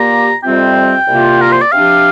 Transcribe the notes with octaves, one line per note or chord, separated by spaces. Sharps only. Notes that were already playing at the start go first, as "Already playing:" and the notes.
Already playing: A#2 A#3 G4 A#5
F2 C3 G3 C4 F4 G5
C2 C3 A#3 F4
A#4
C5
D5
C3 F3 D4 G4 F5